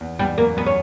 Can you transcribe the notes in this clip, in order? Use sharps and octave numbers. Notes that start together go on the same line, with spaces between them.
E2
E2 G3
F#2 A#3
F#2 B3
C#4